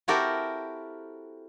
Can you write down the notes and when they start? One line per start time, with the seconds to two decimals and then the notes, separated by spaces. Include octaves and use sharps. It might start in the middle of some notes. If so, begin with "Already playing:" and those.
0.08 C4 E4 F#4 G4 A4 A#4